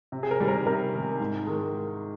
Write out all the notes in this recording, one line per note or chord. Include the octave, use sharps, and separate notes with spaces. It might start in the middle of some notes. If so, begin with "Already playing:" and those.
C3
G#4
A#4
D#3 G3
A#4
C3 A#4
D#3 G3
G#2
D#3 G#3